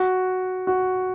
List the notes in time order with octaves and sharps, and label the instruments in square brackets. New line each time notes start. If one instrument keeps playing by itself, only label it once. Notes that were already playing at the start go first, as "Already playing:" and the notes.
Already playing: [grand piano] F#4
F#4